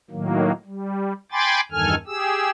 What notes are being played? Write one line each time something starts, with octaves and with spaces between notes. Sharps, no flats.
A2 D#3 F#3 A#3
G3
G5 G#5 B5 C6 D6 A6
E2 G2 D#3 A4 G#5 F6
G4 G#4 E6